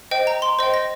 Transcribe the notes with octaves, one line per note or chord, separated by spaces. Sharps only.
C5 D#5 G5
A#5
C6
C5 D#5 G5
A#6